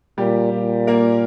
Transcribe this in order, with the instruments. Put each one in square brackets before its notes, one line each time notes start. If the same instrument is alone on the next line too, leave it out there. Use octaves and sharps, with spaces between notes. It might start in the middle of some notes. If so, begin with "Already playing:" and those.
[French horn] A#2 [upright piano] G3 G4
[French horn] A#2
[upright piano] A#3 A#4